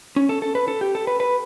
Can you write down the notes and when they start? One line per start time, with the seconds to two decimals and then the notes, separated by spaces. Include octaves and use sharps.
0.16 C#4
0.29 A4
0.42 A4
0.55 B4
0.68 A4
0.81 G4
0.95 A4
1.07 B4
1.20 B4